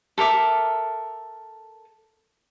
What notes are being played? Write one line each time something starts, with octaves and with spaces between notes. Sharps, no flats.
A4 A#4 E5 D6